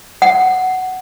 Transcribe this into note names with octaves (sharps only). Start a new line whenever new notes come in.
F#5